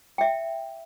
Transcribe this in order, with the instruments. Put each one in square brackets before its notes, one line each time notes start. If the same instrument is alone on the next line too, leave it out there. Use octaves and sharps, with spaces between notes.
[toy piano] E5 G5